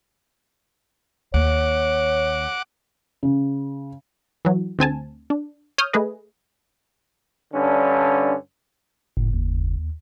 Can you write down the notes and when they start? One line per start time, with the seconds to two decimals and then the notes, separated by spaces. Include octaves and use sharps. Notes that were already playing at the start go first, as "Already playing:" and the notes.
1.34 D#2 C#5 F#5 D6
3.23 C#3
4.45 E3 F#3
4.79 D2 C4 G#5 A5
5.30 D4
5.78 C#5 D#6 F6 G6
5.93 A3 G#4 B4 D#5
7.54 G2 D3 C#4
9.17 F#1 A2
9.33 D#2